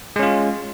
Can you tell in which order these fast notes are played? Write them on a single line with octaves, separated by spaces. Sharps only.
G#3 C#4 F4